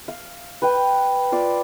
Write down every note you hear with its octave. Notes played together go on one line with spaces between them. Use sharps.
F5
B4 G5
F4 D5 B5